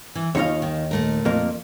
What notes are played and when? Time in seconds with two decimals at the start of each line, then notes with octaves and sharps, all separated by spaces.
0.15 E3
0.35 D#2 D#4 F4 C#5 F5
0.62 D#3
0.91 A#2 A3 A#4
1.25 F2 A#3